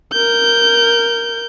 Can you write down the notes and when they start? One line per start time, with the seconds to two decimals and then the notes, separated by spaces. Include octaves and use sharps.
0.12 A#4 G6